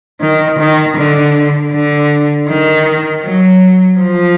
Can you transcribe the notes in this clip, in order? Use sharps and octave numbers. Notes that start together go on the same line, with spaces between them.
D#3
D#3
D3
D3
D#3
F#3
F3